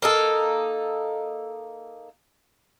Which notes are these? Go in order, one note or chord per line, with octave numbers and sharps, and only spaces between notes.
A#3 D#4 A4